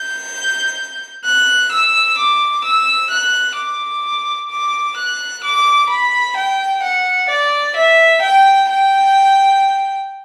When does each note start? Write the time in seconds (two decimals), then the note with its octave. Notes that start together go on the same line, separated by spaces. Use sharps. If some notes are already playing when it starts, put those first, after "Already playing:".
Already playing: G6
1.25 F#6
1.72 E6
2.18 D6
2.64 E6
3.10 F#6
3.57 D6
4.50 D6
4.97 F#6
5.44 D6
5.89 B5
6.37 G5
6.83 F#5
7.29 D5
7.76 E5
8.22 G5
8.69 G5